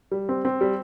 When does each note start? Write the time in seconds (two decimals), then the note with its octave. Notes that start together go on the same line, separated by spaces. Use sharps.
0.11 G3
0.29 C4
0.45 C4
0.61 G3